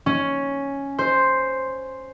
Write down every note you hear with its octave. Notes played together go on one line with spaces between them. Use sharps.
C#4
C5